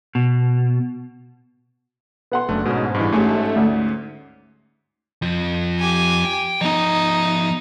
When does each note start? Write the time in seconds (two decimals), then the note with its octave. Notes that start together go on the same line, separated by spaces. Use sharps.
0.15 B2
2.32 B3 F#5 C6
2.49 F#1 A3 D4
2.65 G#2 B2 C#4
2.94 G2 E3
3.12 A1 G#2 A3 C#4 G#4
3.56 D2
5.22 F2 F3
5.79 G4 G#5
6.25 G5
6.61 F3 B3 D#4